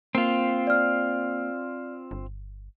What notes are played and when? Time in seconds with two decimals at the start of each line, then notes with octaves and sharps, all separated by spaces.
0.15 A#3 C4 F4
0.67 D5 F6
2.11 G1